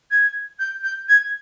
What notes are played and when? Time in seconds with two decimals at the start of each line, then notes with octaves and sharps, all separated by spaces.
0.11 G#6
0.59 G6
0.83 G6
1.09 G#6